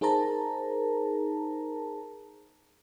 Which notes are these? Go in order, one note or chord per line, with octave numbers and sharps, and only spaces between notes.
D#4 G#4 A#4 C5 A5 A#5